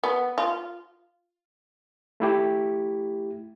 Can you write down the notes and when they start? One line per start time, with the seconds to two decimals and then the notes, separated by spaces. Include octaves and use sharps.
0.04 B3
0.38 F4
2.20 A3 E4 G4